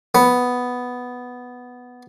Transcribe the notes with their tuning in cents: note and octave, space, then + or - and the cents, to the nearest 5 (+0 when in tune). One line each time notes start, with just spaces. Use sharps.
B3 +0